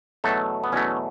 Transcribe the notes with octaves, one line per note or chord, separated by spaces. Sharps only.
E2 B2 F#3 A3 A4
B3
E2 B2 F#3 A3 C#4